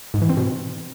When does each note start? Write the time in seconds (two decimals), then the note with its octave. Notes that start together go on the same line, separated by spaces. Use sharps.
0.14 G#2
0.22 E3
0.29 C4
0.37 B2